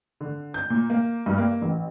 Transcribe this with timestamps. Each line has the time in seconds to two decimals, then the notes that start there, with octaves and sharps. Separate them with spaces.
0.21 D3
0.54 G6
0.70 A#2
0.90 A#3
1.26 G2
1.38 A#3
1.62 A1